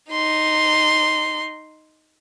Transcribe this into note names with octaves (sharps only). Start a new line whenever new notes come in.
D#4 C6